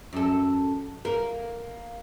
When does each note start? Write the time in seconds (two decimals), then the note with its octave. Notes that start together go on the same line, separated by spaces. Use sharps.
0.13 F#2 A4
1.05 A#3 A#4